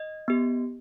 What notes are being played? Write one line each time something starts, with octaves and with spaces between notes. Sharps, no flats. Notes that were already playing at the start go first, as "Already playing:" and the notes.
Already playing: D#5
B3 G4